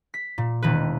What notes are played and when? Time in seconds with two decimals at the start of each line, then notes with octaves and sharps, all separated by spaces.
0.14 B6
0.38 A#2
0.62 E1 D#3 B4